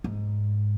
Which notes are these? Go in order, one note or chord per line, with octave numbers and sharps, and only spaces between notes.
G#2